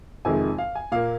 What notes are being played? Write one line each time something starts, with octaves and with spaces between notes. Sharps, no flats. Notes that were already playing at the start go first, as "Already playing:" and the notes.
F2 C3 D#3 G#3 G#5
F5
G#5
A#2 A#3 F5